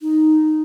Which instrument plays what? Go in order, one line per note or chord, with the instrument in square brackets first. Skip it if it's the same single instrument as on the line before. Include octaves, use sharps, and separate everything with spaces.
[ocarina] D#4